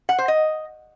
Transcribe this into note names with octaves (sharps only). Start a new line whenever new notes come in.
F#5
C5
D#5